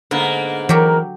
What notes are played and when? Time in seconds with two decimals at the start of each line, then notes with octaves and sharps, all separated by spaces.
0.11 G#2 D3 A#3 B3
0.69 E3 F#3 G4 A#4